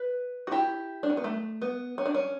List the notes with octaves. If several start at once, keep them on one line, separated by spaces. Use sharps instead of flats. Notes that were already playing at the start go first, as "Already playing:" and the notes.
Already playing: B4
F#4
E4 G4
D4
C#4
B3
A3
B3
C#4
D4
C#4